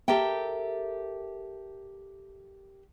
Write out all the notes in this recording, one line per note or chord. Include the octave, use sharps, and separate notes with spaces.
G4 A4 A#4 E5 G5